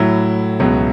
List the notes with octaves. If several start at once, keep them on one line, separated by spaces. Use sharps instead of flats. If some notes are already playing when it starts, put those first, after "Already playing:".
Already playing: A2 F#3 E4
C#2 B2 F#3